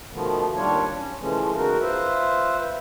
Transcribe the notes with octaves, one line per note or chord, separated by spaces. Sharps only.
B2 D#3 F3 A3 B3
D#2 G3 D4 F4 C#5
C#4
C#3 E3 F3 G#3 A3 C#4
C#3 D#4 F#4 A#4
F4 B4 C5 E5